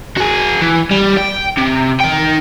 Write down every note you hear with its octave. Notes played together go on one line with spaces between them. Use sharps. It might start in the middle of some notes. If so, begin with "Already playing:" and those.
F#4 G#4
E3
G3
G5
C3
D#4 G5